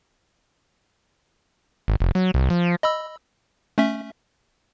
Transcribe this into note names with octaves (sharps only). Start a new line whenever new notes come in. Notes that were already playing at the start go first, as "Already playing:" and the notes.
G#1
F1
F#3
C2
F3
D#5 B5 E6
A3 C#4 E5